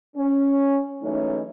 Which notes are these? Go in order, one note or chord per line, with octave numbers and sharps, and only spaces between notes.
C#4
E3 F#3 G#3 A3 C#4 D#4